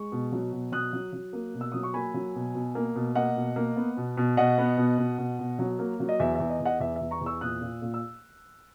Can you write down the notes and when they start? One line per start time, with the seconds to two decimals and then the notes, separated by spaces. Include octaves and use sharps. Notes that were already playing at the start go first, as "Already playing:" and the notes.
Already playing: G#3 C#6
0.12 B2
0.32 F#3
0.52 B2
0.72 F#3 D#6 F#6
0.93 F#3
1.13 F#3
1.33 A#3
1.54 B2
1.61 E6
1.72 F#3 D#6
1.83 C#6
1.94 A#3 G#5 B5
2.14 F#3
2.35 B2
2.55 B2
2.75 A#3
2.95 B2
3.15 A#3 D#5 F#5
3.36 B2
3.56 A#3
3.77 B3
3.97 B2
4.17 B2
4.37 B2 D#5 F#5
4.58 B3
4.78 B2
4.98 B2
5.18 B2
5.39 B2
5.59 F#3
5.79 A#3
6.00 F#3
6.09 D#5
6.19 E2 E5
6.35 E2 E5
6.50 D#5
6.60 E2
6.65 D#5 F#5
6.80 E2 E5
6.96 E2 E5
7.11 A#5 C#6
7.21 E2
7.26 C#6 E6
7.41 A#2 D#6 F#6
7.61 A#2
7.82 A#2
7.94 E6